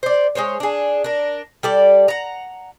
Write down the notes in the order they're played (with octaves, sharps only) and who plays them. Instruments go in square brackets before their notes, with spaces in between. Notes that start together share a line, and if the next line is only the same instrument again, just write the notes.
[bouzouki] C5 D5
G#3 A#3 C5 C#5
D4 G#4
D4 A#4
G3 A4 D5
F#5 A#5